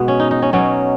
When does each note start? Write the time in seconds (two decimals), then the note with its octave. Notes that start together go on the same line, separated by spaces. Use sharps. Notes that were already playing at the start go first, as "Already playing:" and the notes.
Already playing: B2 G#3 B3
0.08 C#4
0.20 D#4
0.31 D#4
0.42 C#4
0.53 B2 F#3 C#4